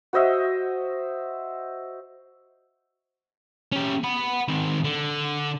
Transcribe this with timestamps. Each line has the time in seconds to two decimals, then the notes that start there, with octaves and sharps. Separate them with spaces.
0.13 F#4 C5 D#5 E5
3.72 C#4 G4
4.04 F#5 B5
4.48 D#3 C4
4.84 D3